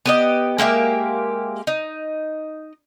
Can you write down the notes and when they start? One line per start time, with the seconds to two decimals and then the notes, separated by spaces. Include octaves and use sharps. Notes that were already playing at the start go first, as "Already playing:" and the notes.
0.06 B3 G4 D#5
0.58 G#3 A#3 G4 E5
1.67 D#4